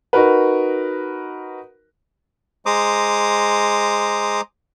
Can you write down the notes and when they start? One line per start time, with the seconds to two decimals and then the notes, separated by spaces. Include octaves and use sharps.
0.13 D#4 F#4 A#4 B4
2.66 G#3 C5 A#5 D6 D#6